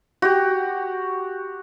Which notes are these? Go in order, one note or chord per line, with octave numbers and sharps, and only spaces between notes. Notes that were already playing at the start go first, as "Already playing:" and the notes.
F#4 G4